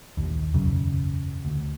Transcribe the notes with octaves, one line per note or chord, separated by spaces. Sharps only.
A#1 D#2
E1 B1 F#2 C#3
D2